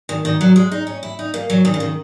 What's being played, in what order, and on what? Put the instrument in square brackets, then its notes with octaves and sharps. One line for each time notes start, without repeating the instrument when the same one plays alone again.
[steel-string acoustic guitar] D#3
D#3
F#3
G#3
D#4
C#4
E4
D#4
A#3
F#3
D#3
C#3
D#3